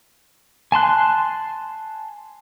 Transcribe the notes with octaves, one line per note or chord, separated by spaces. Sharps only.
G#5 A5 C6 F#6